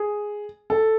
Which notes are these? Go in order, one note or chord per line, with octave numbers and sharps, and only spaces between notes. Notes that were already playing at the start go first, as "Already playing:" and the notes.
Already playing: G#4
A4